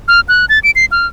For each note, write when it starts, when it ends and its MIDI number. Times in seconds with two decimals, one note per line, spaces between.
0.08 0.20 89
0.29 0.45 90
0.49 0.59 93
0.64 0.71 98
0.76 0.85 96
0.92 1.06 89